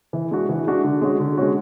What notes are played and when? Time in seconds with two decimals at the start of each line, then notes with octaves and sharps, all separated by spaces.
0.13 E3
0.31 G#3 D4 F#4
0.49 E3
0.67 G#3 D4 F#4
0.84 D3
1.01 G#3 C#4 F#4
1.20 D3
1.38 G#3 C#4 F#4